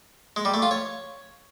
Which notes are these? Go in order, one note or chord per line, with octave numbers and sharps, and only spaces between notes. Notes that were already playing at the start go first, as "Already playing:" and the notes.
G#3
G3
A3
F4
C#5